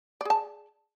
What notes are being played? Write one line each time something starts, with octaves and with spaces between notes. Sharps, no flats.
G#4 D5 A5